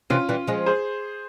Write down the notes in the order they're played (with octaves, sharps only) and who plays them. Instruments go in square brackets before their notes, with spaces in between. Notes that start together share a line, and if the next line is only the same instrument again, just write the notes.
[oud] C3 E3 [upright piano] C#4 F4
[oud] E3 G3
F3 G#3
[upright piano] G#4 C5